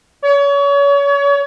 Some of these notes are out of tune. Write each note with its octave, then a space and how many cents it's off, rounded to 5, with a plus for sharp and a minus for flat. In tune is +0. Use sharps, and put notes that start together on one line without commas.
C#5 +35